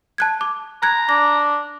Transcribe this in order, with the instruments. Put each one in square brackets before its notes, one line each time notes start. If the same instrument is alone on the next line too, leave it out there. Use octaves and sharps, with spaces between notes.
[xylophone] A5 F#6 G#6
D6
[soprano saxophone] A#5 [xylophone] F#6 G#6
[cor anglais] D4 [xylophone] A#6